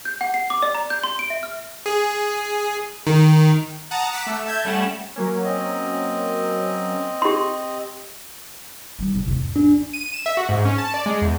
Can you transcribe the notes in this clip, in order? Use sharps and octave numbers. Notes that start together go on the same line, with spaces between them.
G6
F#5
C7
D6
D5
A#5
G6
C6
D7
E5
F6
G#4
D#3
F#5 A5 A#5 D#6
F#5 D6 B6 C#7 E7
A3 E6
E5 A5 G6 G#6
G3 A3 C#4 F#5 E7
F#3 A#3 C#4
C4 D#5
G4 C6
G3 D#4
C3 G#3
G#1 E2
D4
D#7
E7
E5
F#4
G#2
C#4
A5
D5
G#3
E2